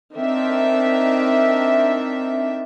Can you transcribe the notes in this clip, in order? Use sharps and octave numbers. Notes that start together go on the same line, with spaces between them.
D#3 C4 D4 E5